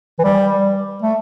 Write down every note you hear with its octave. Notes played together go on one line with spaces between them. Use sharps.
E3
G3
A3